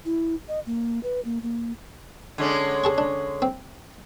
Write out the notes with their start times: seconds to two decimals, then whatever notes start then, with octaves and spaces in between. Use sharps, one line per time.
0.05 E4
0.48 D#5
0.67 A#3
1.03 B4
1.25 A#3
1.43 A#3
2.38 D3 G#3 C#4
2.84 G#4 A5 C#6
2.98 D4
3.42 C4